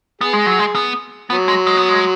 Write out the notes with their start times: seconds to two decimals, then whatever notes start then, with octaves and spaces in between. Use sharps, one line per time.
0.21 B3 G#4
0.33 G#3
0.46 F#3
0.59 G#3
0.75 B3
1.30 F#3 B3
1.48 G#3
1.67 G#3
1.77 B3
1.89 G#3